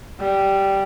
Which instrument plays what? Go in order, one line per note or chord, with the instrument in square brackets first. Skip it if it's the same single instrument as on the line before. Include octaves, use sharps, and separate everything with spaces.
[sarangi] G3